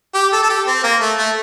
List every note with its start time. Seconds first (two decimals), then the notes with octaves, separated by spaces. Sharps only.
0.15 G4
0.33 A4
0.43 A4
0.50 G4
0.67 C4
0.83 A#3
1.01 A3
1.18 A3